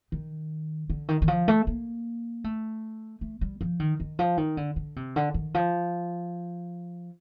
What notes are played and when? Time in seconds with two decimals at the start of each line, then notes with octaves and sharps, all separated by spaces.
0.12 D#3
0.90 D3
1.09 D#3
1.22 D#3
1.28 F3
1.48 A3
1.67 A#3
2.44 A3
3.21 A3
3.41 G3
3.61 F3
3.80 D#3
4.00 D#3
4.19 F3
4.37 D#3
4.57 D3
4.76 D3
4.96 C3
5.16 D3
5.34 D#3
5.54 F3